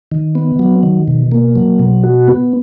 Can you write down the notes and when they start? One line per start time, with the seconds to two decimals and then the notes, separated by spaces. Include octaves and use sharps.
0.12 D#3
0.35 B3
0.59 F#3
0.83 D#3
1.08 B2
1.32 A#3
1.56 F#3
1.79 B2
2.04 F#4
2.28 B3